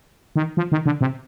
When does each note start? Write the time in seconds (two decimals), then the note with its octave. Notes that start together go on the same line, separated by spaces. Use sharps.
0.36 D#3
0.57 F3
0.72 D#3
0.86 D3
1.01 C3